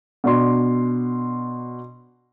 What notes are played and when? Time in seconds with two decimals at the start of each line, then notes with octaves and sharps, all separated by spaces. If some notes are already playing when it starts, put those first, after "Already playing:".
0.24 B2 D4 C6